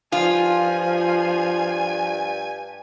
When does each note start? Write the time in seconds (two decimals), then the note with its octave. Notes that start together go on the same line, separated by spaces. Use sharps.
0.12 G2 F3 F4 G#5